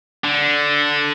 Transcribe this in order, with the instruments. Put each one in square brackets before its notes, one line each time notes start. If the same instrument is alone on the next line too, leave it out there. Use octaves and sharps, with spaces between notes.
[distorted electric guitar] D3